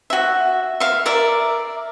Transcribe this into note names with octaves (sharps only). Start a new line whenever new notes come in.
F#4 E5
E5 F5
A#4 D5 E5